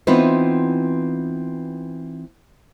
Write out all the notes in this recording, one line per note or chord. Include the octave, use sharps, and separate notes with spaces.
E3 B3 C4 D#4 F4 B4